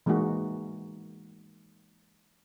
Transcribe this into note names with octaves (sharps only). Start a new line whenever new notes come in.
E3 G#3 A#3 D#4 F#4